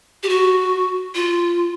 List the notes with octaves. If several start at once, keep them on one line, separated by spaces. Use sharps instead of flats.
G4
F#4
F4